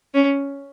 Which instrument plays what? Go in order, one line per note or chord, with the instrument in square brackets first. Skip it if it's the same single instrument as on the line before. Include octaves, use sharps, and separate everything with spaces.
[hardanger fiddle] C#4